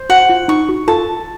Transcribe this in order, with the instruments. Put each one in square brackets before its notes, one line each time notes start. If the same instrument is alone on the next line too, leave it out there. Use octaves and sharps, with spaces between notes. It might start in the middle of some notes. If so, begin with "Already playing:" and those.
Already playing: [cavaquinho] C5
[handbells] F#4 [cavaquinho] F#5
[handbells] F4
[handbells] D#4 [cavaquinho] C#6
[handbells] F#4
[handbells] F4 A4 [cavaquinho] A5